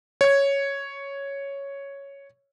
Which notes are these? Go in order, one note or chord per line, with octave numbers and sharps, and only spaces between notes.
C#5 G#6